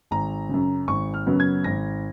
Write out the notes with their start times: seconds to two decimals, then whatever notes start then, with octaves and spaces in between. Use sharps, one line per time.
0.11 G#1 A#5
0.49 F#2 C#3
0.88 G#1 C#6
1.14 F6
1.26 F#2 C#3 F#3 B3
1.40 G#6
1.64 G#1 A#6